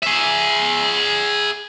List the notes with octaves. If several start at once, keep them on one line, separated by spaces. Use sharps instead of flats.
G#4 E5